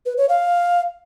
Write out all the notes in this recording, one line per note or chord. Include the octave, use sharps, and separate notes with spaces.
B4
C#5
F5